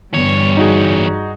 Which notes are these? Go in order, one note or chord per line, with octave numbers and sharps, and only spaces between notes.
G1 E2 G2 G3 B3 C#5
D#4 F#4 G#4